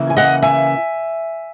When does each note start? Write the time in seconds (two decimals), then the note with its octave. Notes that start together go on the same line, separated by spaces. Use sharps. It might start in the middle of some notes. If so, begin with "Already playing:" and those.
Already playing: C#3 E3 A#3 E4
0.10 G#5
0.17 D#5 F#5
0.42 E5 G#5